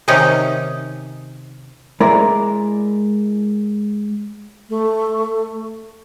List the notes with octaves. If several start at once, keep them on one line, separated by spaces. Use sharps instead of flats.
C3 D#3 C#4 D#4
G#3 E4 A#4 D5
A3